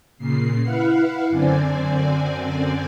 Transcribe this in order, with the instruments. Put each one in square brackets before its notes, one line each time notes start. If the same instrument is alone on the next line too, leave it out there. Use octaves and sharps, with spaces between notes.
[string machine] A#2 C#3 C7
E4 B4 F5 F#5
F#2 D3 C4 D5 G#5